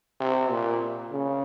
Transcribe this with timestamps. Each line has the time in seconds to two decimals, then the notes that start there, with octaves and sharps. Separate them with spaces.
0.21 C3
0.51 A#2
1.12 C#3